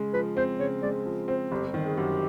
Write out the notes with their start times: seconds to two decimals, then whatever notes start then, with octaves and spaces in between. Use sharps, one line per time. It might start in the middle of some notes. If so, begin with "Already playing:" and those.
Already playing: C#3 G#3
0.14 F3 B4
0.37 C4 C5
0.60 C#3 C#5
0.83 G#3 D5
1.06 F3
1.28 C4 C5
1.51 G1 G4
1.74 D#3
1.85 G#4
1.97 F#2 G4